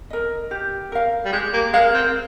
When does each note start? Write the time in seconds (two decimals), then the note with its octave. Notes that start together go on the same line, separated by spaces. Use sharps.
0.10 A#4 D#5
0.51 G4
0.92 A#4 F5
1.25 G3
1.33 G#3 G4
1.53 A#3
1.73 G#3 A#4 F5
1.94 C4